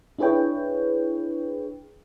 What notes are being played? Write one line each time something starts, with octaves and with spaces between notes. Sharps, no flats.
D4 E4 G#4 B4 C#5 G5